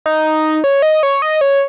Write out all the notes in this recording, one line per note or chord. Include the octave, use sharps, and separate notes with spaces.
D#4
C#5
D#5
C#5
D#5
C#5